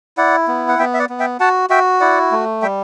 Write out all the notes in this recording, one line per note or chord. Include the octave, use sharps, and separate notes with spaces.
E4 D5 F#5
B3
F#5
B3 E5 G5
E5
D5 F#5
B3
E5 G5
F#4 F#5 A5
F#4 E5 G5
E4 D5 F#5
A3
G3 E5 G5